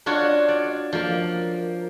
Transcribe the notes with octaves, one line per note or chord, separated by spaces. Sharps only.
D4 F4 F#4 C#5
D5
F3 A#3